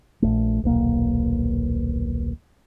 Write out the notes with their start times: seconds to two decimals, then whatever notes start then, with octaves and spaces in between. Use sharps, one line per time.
0.22 A#1 D#2 A3
0.64 D#1 B1 A#3